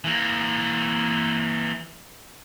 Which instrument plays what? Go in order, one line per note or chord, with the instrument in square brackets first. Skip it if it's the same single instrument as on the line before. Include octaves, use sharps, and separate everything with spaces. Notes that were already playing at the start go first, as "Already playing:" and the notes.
[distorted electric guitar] E3 A#3